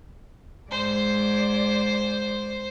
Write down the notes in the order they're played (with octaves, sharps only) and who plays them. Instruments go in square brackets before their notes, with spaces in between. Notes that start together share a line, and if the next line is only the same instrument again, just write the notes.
[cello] G#2 D5 [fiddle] C5